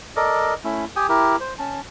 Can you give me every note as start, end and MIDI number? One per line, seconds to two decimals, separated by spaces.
0.16 0.54 69
0.16 0.54 70
0.16 0.54 74
0.16 0.54 75
0.64 0.85 57
0.64 0.85 61
0.64 0.85 64
0.96 1.07 67
0.96 1.07 79
0.96 1.07 80
0.96 1.07 87
1.09 1.36 64
1.09 1.36 67
1.09 1.36 70
1.40 1.54 72
1.59 1.81 61
1.59 1.81 81